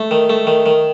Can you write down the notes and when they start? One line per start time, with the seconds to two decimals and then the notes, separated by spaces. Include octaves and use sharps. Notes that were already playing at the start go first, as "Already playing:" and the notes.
Already playing: A3
0.11 D#3
0.30 A3
0.47 D#3
0.66 D#3